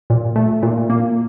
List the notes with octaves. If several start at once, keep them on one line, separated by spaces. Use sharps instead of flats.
A#2
A3
A#2
A#3